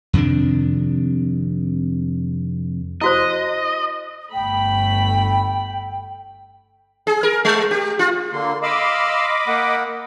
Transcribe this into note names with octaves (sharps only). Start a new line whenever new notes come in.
F2 C3 D#3 D4
E4 F#4 C5 D#5
G1 A3 G5 B5
G#4
A#4
G#3
G4
F4
D3 A#3 C6
D#5 F5 B5 C6 D6 E6
A#3 F#5